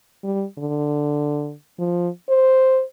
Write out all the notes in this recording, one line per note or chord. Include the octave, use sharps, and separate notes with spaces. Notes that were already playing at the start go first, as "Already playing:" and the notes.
G3
D3
F3
C5